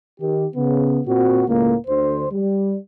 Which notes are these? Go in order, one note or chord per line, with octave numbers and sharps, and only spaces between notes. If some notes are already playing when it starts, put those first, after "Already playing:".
D#3 G4
C#3 B3
A#2 C4 F#4
C#2 A2 A#3
D2 D3 C5
G3